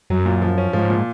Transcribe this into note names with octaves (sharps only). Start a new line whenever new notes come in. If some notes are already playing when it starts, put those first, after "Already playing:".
F#2 F#3
A#2
F3
C#4
G#2 F3
A#2